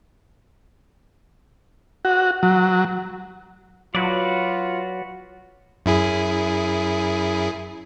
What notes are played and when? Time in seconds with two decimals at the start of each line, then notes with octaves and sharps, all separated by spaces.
2.05 F#4
2.43 F#3
3.95 F#3 F4 F#4 B4 D5
5.86 F#2 E4 G#4